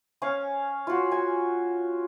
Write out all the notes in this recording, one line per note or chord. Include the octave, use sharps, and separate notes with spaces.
C#4 F5 G#5
F4 F#4
G#5